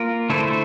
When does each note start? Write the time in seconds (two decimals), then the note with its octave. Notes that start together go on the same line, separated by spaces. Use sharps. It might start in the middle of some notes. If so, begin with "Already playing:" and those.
Already playing: A#3 F4 A#4
0.30 D3 A3 E4 A4 C5